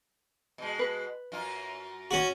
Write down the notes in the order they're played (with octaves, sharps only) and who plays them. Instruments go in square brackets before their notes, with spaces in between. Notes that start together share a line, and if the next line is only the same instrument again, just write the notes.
[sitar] B2 G#3
[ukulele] B4
[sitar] F#2 F4
[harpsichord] C#4 F#4